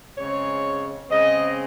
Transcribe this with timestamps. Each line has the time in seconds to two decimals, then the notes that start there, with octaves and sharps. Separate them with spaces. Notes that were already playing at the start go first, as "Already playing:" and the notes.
0.18 C#3 G#3 C4 C#5
1.10 C#3 G#3 C4 D#5